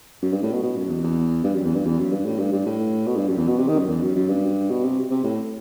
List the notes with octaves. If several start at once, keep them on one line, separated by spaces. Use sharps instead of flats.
F#2
G2
A2
B2
B2
F#2
E2
E2
G2
F#2
E2
G2
E2
F#2
G2
A2
G2
G2
A2
B2
G2
F#2
E2
B2
C3
D#3
F#2
E2
F#2
F#2
G2
B2
C3
C3
A2